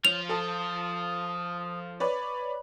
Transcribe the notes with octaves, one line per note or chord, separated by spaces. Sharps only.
F3 F4 C#5 F7
A4 A5 D#6
B4 C#5 D5 B5